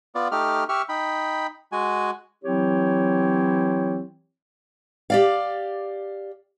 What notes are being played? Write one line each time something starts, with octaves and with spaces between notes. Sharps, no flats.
B3 F4 D5
A3 D#4 G4 F6
G4 E5 C#6 F6
D#4 G5 B5
G#3 F#4 G#5
E3 F#3 C4 E4 G4 C#5
G4 D5 F5